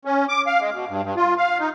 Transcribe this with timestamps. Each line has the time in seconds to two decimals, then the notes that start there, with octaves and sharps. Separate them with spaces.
0.05 C#4
0.29 D6
0.47 F5
0.60 G#3
0.74 B2
0.88 G2
1.03 G2
1.17 F4
1.38 F5
1.60 D#4